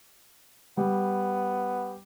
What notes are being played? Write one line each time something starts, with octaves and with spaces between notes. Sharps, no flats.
G3 B3